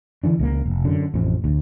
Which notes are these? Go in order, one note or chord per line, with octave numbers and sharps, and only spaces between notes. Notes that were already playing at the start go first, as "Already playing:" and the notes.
D3 E3 F3 D4
C#2 G#3 A#3
F1
F#2 D3
A1 F2
D2